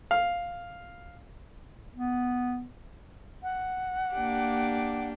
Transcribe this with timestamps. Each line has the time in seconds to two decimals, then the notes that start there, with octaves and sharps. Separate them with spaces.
0.11 F5
1.95 B3
3.43 F#5
4.13 A#3 D4 G4